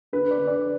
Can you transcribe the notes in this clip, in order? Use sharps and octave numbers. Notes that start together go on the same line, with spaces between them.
D3 B4
D5
D3
D5